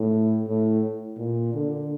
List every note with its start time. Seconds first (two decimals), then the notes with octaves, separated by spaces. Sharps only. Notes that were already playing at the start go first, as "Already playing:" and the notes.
Already playing: A2
0.48 A2
1.18 A#2
1.54 D3